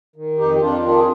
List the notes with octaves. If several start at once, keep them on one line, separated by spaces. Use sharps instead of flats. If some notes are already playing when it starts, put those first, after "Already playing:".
D#3
F2 D#4 G4
G4
F2 D4 F4
D#3 D4 F4
G#4